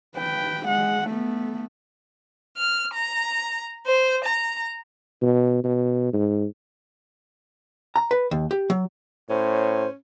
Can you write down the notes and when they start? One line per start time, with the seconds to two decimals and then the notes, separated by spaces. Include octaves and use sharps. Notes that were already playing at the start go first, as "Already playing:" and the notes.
0.16 B4 G5
0.66 G#3 F#5
1.07 A3 B3
2.57 F6
2.93 A#5
3.87 C5
4.24 A#5
5.21 B2
5.64 B2
6.13 G#2
7.96 A#5
8.11 B4
8.31 D#2
8.51 G4
8.70 F#3
9.29 A2 C#4 C5